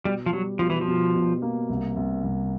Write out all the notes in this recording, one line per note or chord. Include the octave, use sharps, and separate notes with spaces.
B2 G3
F3
F#3 G3
B2 F3
E3
F3
B2
B2
A#3
C2
C2
C2